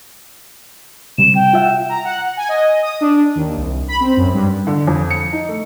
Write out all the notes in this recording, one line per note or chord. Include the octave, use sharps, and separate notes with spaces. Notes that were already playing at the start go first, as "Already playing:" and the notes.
C3 G3 E7
G5
F4 E5 F#5
A#5
F#5
G#5
D#5
D#6
D4
D#2
C2
B5
C4
F#2
G2
D3
F2
C#7
D#4
A3